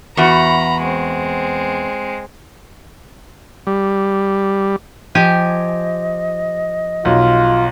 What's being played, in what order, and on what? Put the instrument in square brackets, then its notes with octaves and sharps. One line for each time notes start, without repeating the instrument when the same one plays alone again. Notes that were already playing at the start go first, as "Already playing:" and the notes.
[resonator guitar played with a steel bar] E2 F#4 [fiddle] A#5 B5
[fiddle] G#3 C4
[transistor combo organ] G3
[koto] F3 G4 G#5 [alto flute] D#5
[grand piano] B1 [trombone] F4